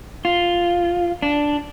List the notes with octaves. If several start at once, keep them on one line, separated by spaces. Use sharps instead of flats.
F4
D4